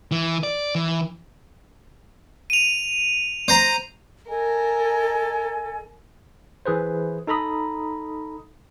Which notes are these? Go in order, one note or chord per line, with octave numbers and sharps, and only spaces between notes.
E3
D5
E3
D#7 F7
C5 A#5
A4 A#4 D#5 G#5
E3 G#4 B4 C5
D#4 A4 A#5 B5 D#6